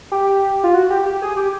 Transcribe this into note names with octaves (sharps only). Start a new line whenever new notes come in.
G4
F4
F#4
G4
G4
G#4
G4